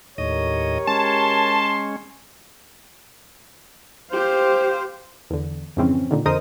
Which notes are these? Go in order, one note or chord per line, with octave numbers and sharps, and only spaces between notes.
D#2 A2 G4 A#4 C#5 D#5
G#3 C#4 A5 C6
G4 C5 F5
E2 D3
F2 G#2 C#3 E3 C4 C#4
A#2 D3 D#3
F2 D3 A#4 C5 D#5 D#6